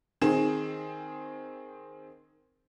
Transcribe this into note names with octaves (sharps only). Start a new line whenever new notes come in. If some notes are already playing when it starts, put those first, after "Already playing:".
D#3 C4 G#4 E7